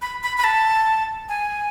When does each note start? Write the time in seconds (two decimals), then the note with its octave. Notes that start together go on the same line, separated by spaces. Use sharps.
0.02 B5
0.23 B5
0.38 B5
0.44 A5
1.29 G#5